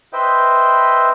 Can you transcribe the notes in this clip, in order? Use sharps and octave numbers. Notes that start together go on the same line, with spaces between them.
B4 C5 D#5 E5 G5